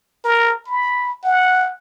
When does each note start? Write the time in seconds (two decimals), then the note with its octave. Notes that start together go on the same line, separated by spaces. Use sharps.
0.25 A#4
0.67 B5
1.24 F#5